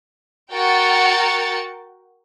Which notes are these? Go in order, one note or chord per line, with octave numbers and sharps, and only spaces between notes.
F#4 A#4 G5 A6 C#7